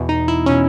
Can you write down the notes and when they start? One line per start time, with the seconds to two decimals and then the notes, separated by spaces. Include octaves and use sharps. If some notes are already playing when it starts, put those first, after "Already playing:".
Already playing: E2 B2
0.09 D#4
0.28 E4
0.46 B2 C#4